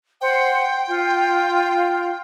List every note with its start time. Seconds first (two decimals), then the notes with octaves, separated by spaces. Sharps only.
0.21 C5 F#5 G5
0.87 F4